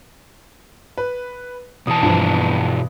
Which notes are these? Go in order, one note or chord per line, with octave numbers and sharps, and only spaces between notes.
B4
B2 E3 A5 D#6
G2 F3